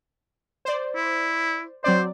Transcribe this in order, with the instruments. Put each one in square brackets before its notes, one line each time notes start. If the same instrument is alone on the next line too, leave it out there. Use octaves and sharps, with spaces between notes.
[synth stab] C5 D5
[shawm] E4
[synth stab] F#3 C4 D5 [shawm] C5